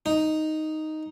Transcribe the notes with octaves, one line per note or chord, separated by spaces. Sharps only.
D#4